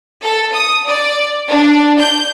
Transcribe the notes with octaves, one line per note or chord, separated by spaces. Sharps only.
A4
D#6
D5
D4
G6